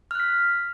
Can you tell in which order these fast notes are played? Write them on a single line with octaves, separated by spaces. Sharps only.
F6 F#6 B6